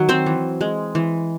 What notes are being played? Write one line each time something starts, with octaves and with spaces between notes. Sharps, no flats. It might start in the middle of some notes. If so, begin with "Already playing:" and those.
Already playing: D#3 F#3
C4 C5
E3
G#3
E3